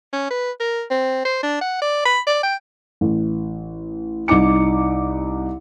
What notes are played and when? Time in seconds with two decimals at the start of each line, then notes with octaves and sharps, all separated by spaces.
0.13 C#4
0.31 B4
0.60 A#4
0.91 C4
1.25 C5
1.43 D4
1.62 F#5
1.82 D5
2.06 B5
2.27 D5
2.43 G5
3.01 A1
4.28 C2 D#4 D6 C#7